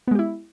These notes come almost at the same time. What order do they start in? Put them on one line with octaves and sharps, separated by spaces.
B3 G#3 G4 E4